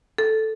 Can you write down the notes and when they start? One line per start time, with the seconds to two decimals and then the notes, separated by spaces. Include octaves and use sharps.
0.18 A4